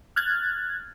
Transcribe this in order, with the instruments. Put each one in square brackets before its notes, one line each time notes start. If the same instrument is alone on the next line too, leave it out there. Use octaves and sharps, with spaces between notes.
[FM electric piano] F6 F#6 G#6 A6